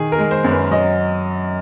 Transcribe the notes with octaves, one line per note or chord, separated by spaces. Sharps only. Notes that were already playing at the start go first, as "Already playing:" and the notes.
Already playing: D#3 G#4
A#4
G#3
C5
F#2
B4
F#3 D#5